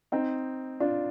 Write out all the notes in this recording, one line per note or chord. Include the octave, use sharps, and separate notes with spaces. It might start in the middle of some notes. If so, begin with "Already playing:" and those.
C4 D#4
D4 F4